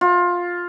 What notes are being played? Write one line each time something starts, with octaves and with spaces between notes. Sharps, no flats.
F4